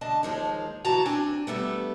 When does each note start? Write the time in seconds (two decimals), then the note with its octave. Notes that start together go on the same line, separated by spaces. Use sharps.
0.01 D2 D4 D#5 A5
0.23 D#2 F3 G#3 D#4
0.85 D2 E3 F#4 A5 A#5
1.05 C4 D4 G#5
1.47 E2 G3 A3 B3